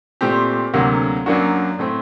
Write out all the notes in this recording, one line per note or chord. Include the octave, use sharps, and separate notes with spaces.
A#2 A3 C4 G4
D2 C3 F#3 A#3
F#2 F#3 A#3 D4 F#4
A2 A3 C4